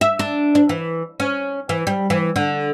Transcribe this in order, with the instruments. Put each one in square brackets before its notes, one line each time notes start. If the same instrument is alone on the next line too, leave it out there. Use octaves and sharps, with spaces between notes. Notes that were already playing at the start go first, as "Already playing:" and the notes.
[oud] E5
D4
D4
E3
C#4
E3
G3
E3
D3